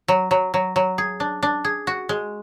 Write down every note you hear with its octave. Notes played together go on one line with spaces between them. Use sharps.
F#3
F#3
F#3
F#3
G#4
D4
D4
G#4
F#4
G#3